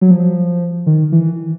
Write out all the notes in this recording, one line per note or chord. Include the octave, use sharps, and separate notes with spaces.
F#3
F3
D#3
E3